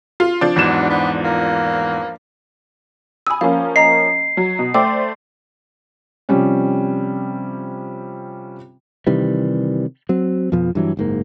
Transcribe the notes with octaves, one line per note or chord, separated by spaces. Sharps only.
F4
F3 D4
E2 G#2 F#3 E7
B3
A#3
G#5 B5 D#6 E6
F3 A#3 C#4 F5
D#5 A#5 C7
F#3
B2
A3 C5 D5 G5 D6 E6
C3 F3 G3 C#4
C3 D#3 E3 G3
F#3 C4
F2 B2 F3
G2 E3 F#3
F#1 G#2 A#3